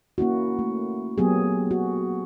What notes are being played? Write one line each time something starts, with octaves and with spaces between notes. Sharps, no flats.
A#3 C#4 E4 F#4
A3
F#3 A#3 B3 G4 G#4
F#4